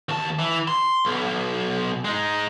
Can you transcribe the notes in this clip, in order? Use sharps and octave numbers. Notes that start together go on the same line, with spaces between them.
D#2 A5
E3
C6
B1 B2
G#3 D#4